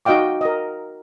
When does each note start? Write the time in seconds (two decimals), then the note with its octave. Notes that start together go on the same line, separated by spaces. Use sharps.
0.05 D#4 F#4 D#5 F5 G5 D6
0.41 A#4 D#5